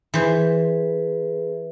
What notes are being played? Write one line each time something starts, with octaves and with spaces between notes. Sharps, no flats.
E3 G#4 B4 C5 E5